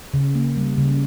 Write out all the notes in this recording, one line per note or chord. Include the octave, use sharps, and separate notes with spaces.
C#3
A#3
G3
C#3